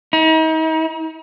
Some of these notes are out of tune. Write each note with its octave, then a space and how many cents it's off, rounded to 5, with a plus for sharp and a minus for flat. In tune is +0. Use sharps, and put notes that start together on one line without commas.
D#4 +40